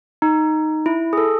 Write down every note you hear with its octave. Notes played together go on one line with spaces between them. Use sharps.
D#4
E4
G#4
A4